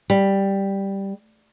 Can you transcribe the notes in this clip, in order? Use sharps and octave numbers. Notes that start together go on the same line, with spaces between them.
G3